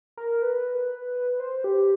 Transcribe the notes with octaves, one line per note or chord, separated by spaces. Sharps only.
A#4
B4
C5
G4